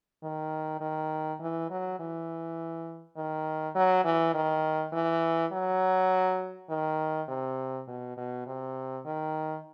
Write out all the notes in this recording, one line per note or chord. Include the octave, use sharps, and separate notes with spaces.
D#3
D#3
E3
F#3
E3
D#3
F#3
E3
D#3
E3
F#3
D#3
C3
B2
B2
C3
D#3